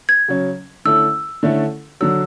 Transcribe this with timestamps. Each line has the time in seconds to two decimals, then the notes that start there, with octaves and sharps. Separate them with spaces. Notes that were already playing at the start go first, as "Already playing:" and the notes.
0.09 G#6
0.28 C#3 F#3 C#4
0.85 D3 A3 C#4 E4 A4 E6
1.43 D3 A3 C#4 E4 A4
2.01 D3 F#3 E6